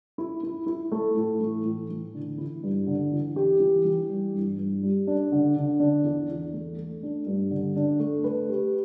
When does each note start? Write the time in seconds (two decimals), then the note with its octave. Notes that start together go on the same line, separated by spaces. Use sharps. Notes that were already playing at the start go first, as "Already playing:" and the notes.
0.18 E4
0.43 E4
0.66 E4
0.92 A3
1.16 A2
1.40 E3
1.64 A2
1.90 E3
2.14 D3
2.38 E4
2.63 G2
2.87 D3
3.12 E3
3.36 G4
3.60 E3
3.85 E3
4.10 G3
4.34 G2
4.58 G2
4.83 G3
5.07 D4
5.32 D3
5.56 D3
5.80 D4
6.04 E2
6.30 E2
6.53 A3
6.78 A3
7.03 D4
7.26 G2
7.51 D3
7.76 D4
8.00 A3
8.24 B4
8.49 G4